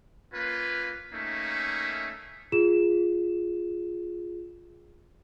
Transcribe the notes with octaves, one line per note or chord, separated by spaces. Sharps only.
A#3 C#4 F4 B4
A3 A#3 C#4 D#4 E5
F4 G#4 E7